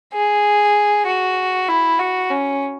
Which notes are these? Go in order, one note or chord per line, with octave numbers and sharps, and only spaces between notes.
G#4
F#4
E4
F#4
C#4